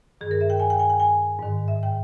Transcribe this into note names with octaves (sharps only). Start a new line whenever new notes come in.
G2 D#3 G#4
A#4
E5
G5
G#5
G5
G#5
G5
G#5
G#2 D#3
E5
G5